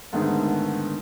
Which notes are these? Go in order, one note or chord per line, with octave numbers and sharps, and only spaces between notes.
G#2 D3 D#3 A3 B3 D#4